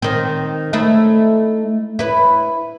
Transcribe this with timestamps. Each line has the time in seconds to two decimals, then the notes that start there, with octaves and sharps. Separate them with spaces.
0.02 D#3 C4
0.73 A3 D#4 E4
1.99 E4 B4